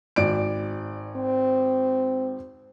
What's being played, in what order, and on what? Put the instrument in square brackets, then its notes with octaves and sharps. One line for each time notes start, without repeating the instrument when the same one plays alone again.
[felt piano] G#1 D5 D7
[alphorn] C4